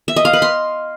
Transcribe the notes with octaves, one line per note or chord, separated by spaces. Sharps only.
E5
D#5
F5
B4
C6